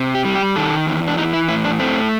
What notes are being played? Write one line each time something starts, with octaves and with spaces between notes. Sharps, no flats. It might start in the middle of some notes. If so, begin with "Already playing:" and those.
Already playing: C3
G4
G3
G4
D#3 A4
E2
D4
E3 D#4
E4
A2 E4
D4
A3 C4